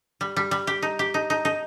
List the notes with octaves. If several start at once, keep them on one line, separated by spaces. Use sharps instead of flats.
G3
G3
G3
G4
D#4
G4
D#4
D#4
D#4